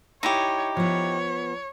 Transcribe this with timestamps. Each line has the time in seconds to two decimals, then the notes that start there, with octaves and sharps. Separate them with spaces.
0.23 D#4 E4 G4 C#5
0.77 F3 B3 C#5